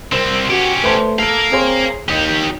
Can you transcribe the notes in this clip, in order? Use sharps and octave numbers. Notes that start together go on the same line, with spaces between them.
C2 C4 A#4 C5
C#4 F#4 G4
A3 B4 C5 A5
A4 A#4 F5 D7
C4 G#4 C#5 C6
G#1 D#2 D#4 G4